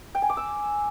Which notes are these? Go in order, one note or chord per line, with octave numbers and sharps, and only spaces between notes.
G5
G#5
D6
E6